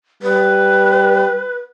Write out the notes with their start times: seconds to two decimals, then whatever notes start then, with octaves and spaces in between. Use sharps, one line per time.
0.23 G3 B4